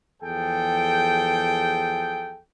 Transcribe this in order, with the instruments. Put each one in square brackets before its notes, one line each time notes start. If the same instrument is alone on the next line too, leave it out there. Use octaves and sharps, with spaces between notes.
[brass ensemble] E2 F3 G#4 A4 G5